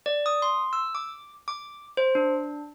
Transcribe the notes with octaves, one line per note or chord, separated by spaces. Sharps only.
D5
D#6
C6
E6
D6
D6
C5
D4